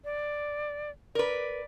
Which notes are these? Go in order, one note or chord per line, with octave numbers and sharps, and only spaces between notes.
D5
A#4 B4 D5